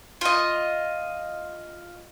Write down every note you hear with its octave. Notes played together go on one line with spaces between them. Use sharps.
F4 D#5